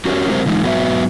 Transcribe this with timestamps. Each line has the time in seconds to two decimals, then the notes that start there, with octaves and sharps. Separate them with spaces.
0.05 C#4 F#4 G4 A#4 C#5
0.29 F#3 G#3 C4 G4 A#4 C5
0.46 D3 E3 G#3 D#4
0.63 G#2 F#3 B3 F#4 B4 E5